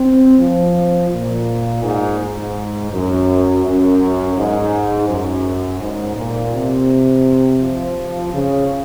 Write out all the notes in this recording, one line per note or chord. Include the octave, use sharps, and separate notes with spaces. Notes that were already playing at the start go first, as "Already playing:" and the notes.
Already playing: C4
F3
A#2
G#2
G#2
F#2
F#2
G#2
F#2
G#2
A#2
C3
F3
C#3